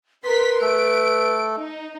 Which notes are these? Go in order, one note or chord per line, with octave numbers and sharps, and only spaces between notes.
A#4 B4 C6 B6
A3 A4 D7
D#4